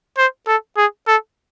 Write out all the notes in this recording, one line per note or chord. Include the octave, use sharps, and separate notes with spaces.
C5
A4
G#4
A4